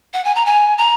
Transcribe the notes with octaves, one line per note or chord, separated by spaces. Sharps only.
F#5
G#5
A#5
G#5
A#5